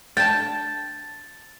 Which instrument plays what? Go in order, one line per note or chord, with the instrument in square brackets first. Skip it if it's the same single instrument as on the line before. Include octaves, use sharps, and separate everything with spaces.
[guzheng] G5 A5 [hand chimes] A6